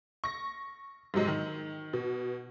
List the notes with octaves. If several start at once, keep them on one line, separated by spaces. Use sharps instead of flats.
C#6 A#6
G#2 C3 F#3 G#3
D#3
B2